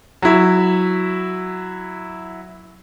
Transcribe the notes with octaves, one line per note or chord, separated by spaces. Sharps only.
F#3 E4